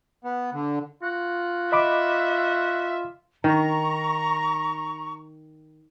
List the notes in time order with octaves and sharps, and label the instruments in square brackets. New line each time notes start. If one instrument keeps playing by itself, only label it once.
[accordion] B3
D3
[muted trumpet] F4 [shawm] F#4
[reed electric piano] D#5 B5 D6 [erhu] E5
[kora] D#3 [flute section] A#5 C#6